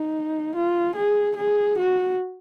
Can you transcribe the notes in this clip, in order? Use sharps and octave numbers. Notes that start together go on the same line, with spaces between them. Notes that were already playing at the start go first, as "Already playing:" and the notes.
Already playing: D#4
F4
G#4
G#4
F#4